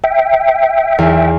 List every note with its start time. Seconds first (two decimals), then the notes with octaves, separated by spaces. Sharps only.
0.04 E5 G5
0.98 E2